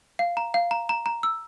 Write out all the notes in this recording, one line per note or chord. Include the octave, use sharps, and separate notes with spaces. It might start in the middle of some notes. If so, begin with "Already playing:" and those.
F5
A#5
F5
A#5
A#5
A#5
E6